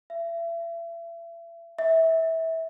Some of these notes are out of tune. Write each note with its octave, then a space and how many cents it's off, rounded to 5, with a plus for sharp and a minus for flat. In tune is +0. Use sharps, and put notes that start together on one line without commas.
E5 +35
E5 -20